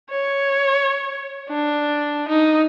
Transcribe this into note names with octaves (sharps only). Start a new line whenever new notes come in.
C#5
D4
D#4